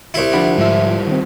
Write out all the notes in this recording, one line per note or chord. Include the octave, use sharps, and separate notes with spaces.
C2 E4
D2 F3 D4 F#5 B5
G#2 G3 F4 E5 A5
D#3 C4